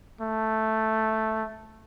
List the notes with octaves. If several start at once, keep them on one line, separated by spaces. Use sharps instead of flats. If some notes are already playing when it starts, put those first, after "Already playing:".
A3